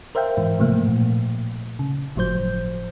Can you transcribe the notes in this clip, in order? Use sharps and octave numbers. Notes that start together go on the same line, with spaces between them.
A#4 C5 E5 F5 G5
G#2 E3
A2 C3 F3 A3 A#3
A#2
C#3
G1 A2 F3 F#3 C5 G6